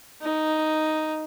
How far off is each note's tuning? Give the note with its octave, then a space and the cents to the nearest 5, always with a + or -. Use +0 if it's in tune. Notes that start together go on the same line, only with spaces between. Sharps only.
D#4 +0